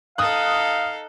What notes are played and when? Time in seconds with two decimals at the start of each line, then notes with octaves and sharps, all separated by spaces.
0.18 D#4 A4 F5 D#6 F#6